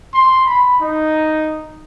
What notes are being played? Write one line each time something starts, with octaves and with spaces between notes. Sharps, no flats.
C6
B5
D#4